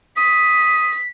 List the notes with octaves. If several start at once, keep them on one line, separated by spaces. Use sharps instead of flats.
D#6 B6